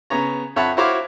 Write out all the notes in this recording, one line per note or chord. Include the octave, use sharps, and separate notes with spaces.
C#3 B3 C#5 A#5
F2 C#5 E5 F#5 A5 B5
E4 F#4 C5 C#5 F5 D6